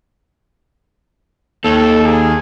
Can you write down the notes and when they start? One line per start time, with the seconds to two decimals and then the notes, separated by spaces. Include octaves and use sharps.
1.64 D#2 A4
2.05 G#4